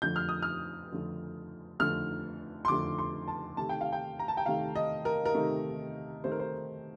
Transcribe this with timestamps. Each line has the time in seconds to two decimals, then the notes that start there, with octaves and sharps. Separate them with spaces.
0.02 F2 D3 F3 A3 G6
0.16 F6
0.29 D#6
0.42 F6
0.92 F2 D3 F3 A3
1.79 F2 D3 F3 A3 F6
2.65 C6
2.68 F2 D3 F3 A3 D6
2.99 C6
3.28 A5
3.57 C3 D#3 A3 A5
3.69 G5
3.81 F5
3.93 G5
4.19 A#5
4.28 A5
4.37 G5
4.46 C3 D#3 A3 F5
4.76 D#5
5.05 A#4
5.26 A#4
5.35 C3 D#3 A3
6.23 C3 D#3 A3 C5
6.32 A#4
6.40 C5